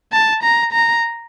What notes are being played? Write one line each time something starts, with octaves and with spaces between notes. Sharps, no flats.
A5
A#5
A#5